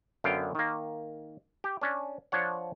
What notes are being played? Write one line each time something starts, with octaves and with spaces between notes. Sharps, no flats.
F#2 D3 B3 F5 G5
D#3 A#3
G4
C#4 D4
F3 D4 C#5 F#5